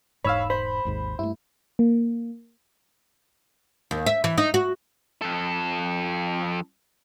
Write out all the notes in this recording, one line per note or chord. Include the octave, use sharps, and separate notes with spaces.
E1 G#2 G#3 C#5 F5 B5 E6
C5 B5
G#1 D#2 G#2
G2 A3 E4
A#3
D#2
E5
E3
D#4
F#4
F2 A4